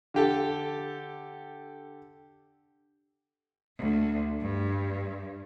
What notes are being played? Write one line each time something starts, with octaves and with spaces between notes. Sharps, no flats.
D3 G4 A4
D2
G2